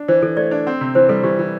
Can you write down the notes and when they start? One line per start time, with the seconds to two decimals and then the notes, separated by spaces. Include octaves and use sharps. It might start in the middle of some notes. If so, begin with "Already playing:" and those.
Already playing: D4
0.08 E3 C5
0.22 E3 A4
0.37 A3 D5
0.51 D4
0.67 C4
0.81 C3
0.95 E3 C5
1.09 G3 A4
1.23 E3 G4
1.39 E3